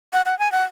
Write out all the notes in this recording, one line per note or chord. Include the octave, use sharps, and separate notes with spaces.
F#5
F#5
G#5
F#5